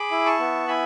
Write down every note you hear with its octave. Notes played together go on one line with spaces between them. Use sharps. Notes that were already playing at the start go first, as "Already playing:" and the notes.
Already playing: G#4 B5 D6
E4
A5 C#6
B3
E4 G#5 B5